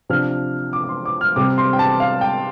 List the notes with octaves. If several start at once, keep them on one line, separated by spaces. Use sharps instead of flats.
C3 F3 D4 F6
D6
D6
C6
D6
F6
C3 G3 C4 D6
C6
G5
A5
F5
G5